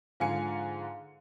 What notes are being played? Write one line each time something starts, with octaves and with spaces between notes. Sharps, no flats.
G#2 D3 F3 F5 G#5 C#7